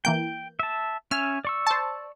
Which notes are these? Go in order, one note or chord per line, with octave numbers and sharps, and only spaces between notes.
E3 A#3 G5 G6
E5 A5
C#4 E5 G#5 F6
D5 C#6 E6
C5 A5